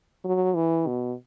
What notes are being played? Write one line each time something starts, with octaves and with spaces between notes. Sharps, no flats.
F#3
E3
B2